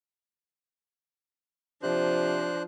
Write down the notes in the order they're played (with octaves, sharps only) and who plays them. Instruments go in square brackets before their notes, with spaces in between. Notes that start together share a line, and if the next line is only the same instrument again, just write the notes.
[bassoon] C3 [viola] F3 [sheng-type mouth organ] D4 C5 F#6